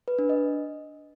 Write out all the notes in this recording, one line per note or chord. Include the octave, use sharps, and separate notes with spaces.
B4
D4
D#5